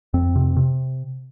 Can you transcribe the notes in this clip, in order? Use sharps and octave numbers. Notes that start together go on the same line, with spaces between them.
F2 C4
C3
C3